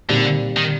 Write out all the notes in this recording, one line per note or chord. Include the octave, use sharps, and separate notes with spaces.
A#2 D3 G3 C4 D#4
D#3